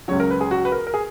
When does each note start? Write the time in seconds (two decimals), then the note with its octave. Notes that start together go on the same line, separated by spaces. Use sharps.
0.08 C#2 C#3 F#3 C#5
0.20 A#4
0.30 B4
0.41 G#4
0.51 F#4
0.65 B4
0.72 A#4
0.87 A#4
0.94 G#4